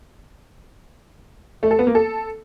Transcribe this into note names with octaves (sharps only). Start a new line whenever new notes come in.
A3
A4
B3
A#3
A4